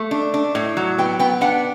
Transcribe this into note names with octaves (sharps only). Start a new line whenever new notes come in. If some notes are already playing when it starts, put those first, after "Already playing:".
Already playing: A3
D4
D4
A2
F#3
B3 G5
B3 G5
D4 F#5